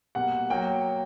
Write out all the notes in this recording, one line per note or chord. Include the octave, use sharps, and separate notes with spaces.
B2 G3 A#3 F#5
F#3 A#3 G5